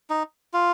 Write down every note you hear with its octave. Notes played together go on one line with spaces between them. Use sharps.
D#4
F4